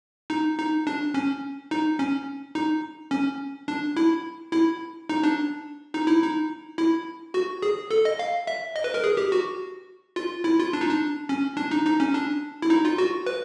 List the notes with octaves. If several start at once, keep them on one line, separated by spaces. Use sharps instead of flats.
D#4
D#4
D4
C#4
D#4
C#4
D#4
C#4
D4
E4
E4
D#4
D4
D#4
E4
D#4
E4
F#4
G#4
A4
D#5
F5
E5
D#5
B4
A#4
G#4
G4
F#4
F4
E4
F4
D4
D#4
D4
C#4
D4
D#4
D#4
C#4
D4
E4
D#4
F4
F#4
B4